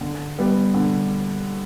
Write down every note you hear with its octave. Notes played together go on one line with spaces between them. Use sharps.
D3
G3 B3
D3